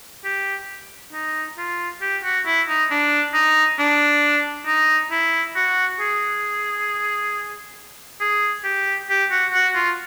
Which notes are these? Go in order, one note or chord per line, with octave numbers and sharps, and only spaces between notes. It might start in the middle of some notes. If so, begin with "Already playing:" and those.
G4
D#4
F4
G4
F#4
E4
D#4
D4
D#4
D4
D#4
E4
F#4
G#4
G#4
G4
G4
F#4
F#4
F4